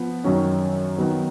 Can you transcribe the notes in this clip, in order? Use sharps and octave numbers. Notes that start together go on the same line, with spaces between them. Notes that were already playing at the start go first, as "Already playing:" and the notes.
Already playing: F3 B3
F#2 D#3 F#3 C#4
D#3 F#3 B3 D#4